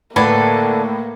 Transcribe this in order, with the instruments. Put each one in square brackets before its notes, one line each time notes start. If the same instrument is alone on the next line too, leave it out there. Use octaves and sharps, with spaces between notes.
[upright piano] A2 B5 G#6 [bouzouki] D3 A4 B4 [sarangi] A#3